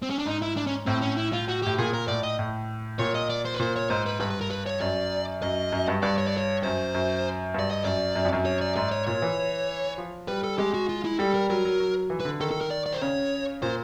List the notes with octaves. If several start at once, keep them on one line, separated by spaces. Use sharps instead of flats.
C4
C#4
D4
G#2 D#4
E4
D4
C#4
A2 C4
C#4
E4
F4
F#4
A2 G4
A#2 G#4
A#4
A2 D5
D#5
A2
A#2 C#5
D#5
D5
C5
B4
A#2 C5
C#5
G#2 C5
B4
G2 B4
B4
A#4
B4
C#5
F#2 D5
F#2 D#5
F#2
G2
G2 D5
C#5
D5
C#5
F#2 C5
F#2
G2 D5
D#5
F#2 D5
F#2
F2
F#2
C#5
D5
G#2 D5
C#5
A#2 C#5
E3
F3
G3 B4
A4
G#3 G4
F#4
F4
E4
G3 A4
A#4
F#3 A#4
F#3
F#3
E3
B4
D3
D#3 A4
A4
A#4
D5
D5
C5
C#3 C#5
A#2 C5